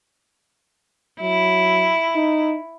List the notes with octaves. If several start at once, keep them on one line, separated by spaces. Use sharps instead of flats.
F#3 E4
D#4